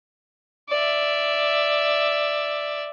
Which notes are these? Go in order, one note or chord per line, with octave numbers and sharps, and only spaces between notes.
D5 E5